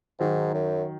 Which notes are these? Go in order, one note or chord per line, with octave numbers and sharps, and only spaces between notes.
G#2 D#3 F#3
F#2